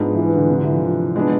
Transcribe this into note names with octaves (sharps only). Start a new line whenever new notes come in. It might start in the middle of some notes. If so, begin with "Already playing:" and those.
Already playing: G#2 F3 G#3 B3 D4
E3
E3
D3
C3
D3
E3
F3
G#3 B3 D4